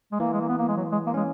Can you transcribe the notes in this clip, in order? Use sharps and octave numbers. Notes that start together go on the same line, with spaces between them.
G#3
E3 A#3
G#3
A#3
B3
A#3
G#3
F#3
G#3
A#3
C#4
G#3